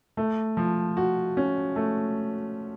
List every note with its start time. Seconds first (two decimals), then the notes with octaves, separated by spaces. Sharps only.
0.17 A3
0.57 F3
0.97 F#4
1.37 C#4
1.76 A3